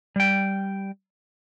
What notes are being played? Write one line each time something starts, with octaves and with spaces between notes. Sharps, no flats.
G3 G5